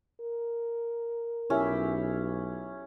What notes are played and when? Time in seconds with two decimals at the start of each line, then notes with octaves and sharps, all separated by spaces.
0.21 A#4
1.50 B1 C#4 E4 G4 E5